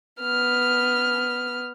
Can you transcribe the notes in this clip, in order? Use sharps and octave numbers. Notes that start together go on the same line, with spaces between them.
B3 F6